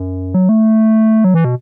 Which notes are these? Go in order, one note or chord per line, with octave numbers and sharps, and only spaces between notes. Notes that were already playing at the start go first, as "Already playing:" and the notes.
Already playing: F#2
F#3
A3
F#3
E3
B2